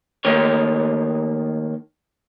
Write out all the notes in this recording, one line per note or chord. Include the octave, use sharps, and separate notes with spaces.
D#3 A3 A#3 C#5